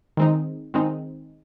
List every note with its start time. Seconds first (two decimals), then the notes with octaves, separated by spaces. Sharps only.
0.17 D#3 G#3 C4 D#4
0.74 D#3 G#3 C4 D#4